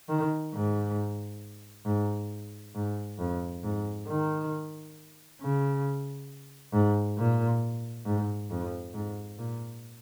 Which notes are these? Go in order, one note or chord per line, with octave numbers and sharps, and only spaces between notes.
D#3
G#2
G#2
G#2
F2
G#2
D#3
C#3
G#2
A#2
G#2
F2
G#2
A#2